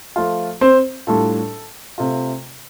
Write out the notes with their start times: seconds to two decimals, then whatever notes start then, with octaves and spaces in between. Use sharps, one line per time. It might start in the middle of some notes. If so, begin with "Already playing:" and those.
0.16 F3 A3 F4
0.61 C4 C5
1.07 A2 G3 D4 F4 A4
1.98 C3 A3 F4